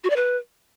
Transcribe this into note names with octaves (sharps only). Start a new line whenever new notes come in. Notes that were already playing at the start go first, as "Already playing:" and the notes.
F#4
D5
B4